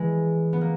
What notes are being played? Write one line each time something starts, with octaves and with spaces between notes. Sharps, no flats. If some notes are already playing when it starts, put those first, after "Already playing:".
Already playing: E3 G#3
B3
A#3